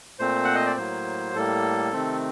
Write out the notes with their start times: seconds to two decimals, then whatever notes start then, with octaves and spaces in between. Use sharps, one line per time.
0.19 A#2 A3 C4 C5
0.45 F#5
0.55 D#5
0.66 D5
0.77 A2 F#3 A#3 C5
1.34 A2 G3 A#3 A4
1.93 C3 D#3 A3 C4